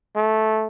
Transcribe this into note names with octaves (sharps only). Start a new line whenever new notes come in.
A3